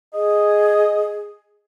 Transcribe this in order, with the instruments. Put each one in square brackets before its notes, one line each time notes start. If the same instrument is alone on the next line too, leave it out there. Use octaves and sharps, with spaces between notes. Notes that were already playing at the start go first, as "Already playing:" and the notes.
[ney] G#4 [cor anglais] D#5